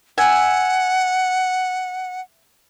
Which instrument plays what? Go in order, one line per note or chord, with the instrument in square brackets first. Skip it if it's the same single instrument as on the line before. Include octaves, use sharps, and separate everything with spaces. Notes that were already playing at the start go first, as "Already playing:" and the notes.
[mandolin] E5 G#5 [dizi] F#5